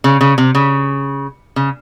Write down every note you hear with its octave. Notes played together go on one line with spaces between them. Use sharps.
C#3
C#3
C3
C#3
C#3